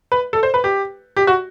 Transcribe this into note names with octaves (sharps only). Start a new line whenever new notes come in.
B4
A4
C5
B4
G4
G4
F#4